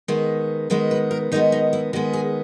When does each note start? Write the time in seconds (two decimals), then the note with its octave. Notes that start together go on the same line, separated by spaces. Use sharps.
0.08 D#3 G#3 B3
0.70 D#3 G#3 B3 B4
0.91 B4
1.11 A#4
1.32 D#3 G#3 B3 D#4
1.52 D#4
1.73 E4
1.93 D#3 G#3 B3 F#4
2.13 G#4